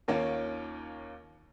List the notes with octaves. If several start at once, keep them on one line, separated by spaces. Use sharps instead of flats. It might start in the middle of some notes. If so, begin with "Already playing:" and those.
D#2 D#3 A#3 C#4 F4